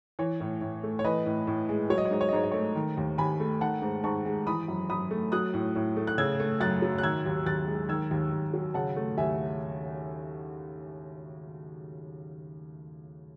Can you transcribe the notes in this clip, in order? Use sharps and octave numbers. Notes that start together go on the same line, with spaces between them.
E3 C#5
A2
A2
A3
C#5
E3 B4 D#5
A2
A2
G#3
F#3 C#5
D#5
C#5
G#2 D#5
C#5
D#5
G#2 C#5
D#5
A3 C#5
D#3
D#2
D#2 G#5 B5
A3
D#3 F#5 A5
G#2
G#2 A5 C#6
G#3
E3 B5 D#6
F#2
F#2 B5 D#6
A3
F#3 D#6 F#6
A2
A2
A3
F#6
C#3 E6 G#6
A3
F#2 F#6 A6
F#3
F#6
D#3 E6 G#6
D#2
D#2 F#6 A6
G#3
D#3 E6 G#6
D#2
D#2
F#3
C#3 F#5 A5
A3
D#2 E5 G#5